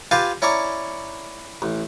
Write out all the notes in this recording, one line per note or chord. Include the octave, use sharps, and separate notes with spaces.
F4 G4 B4 F5 G#5 A5
C#4 E4 D5 A#5 C#6
A1